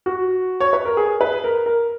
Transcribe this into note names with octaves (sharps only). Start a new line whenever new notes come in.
F#4
C#5
B4
A#4
G#4
B4
A#4
A#4